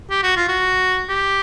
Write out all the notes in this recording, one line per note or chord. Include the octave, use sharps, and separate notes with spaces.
G4
F#4
F4
F#4
G4